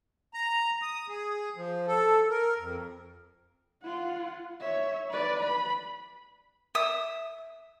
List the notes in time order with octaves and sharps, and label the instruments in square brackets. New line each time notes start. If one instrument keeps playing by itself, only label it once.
[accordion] A#5
D#6
G#4
F3
A4
A#4
F2
[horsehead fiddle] F4 F#5
C#5 E5
B4 D5
B5
[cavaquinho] E5 D#6